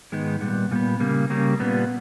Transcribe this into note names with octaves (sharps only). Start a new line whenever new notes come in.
G#2 D#3 G#3 B3 D#4
A#2 G3 B3
A#2 G3 B3
C#3 G3 A#3
C#3 G3 A#3
A#2 G3 B3